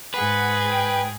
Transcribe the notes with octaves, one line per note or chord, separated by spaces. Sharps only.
G#2 G#4 B4 F#5
G5